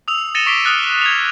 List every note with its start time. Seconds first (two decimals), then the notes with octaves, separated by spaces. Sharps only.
0.08 D#6 E6 F7
0.35 A6 A#6 C#7 D#7 E7 G7
0.46 C#6 D6 B6 C7 D7 G7
0.64 D#6 F6 F#6 A6 D#7
1.01 G#6 F7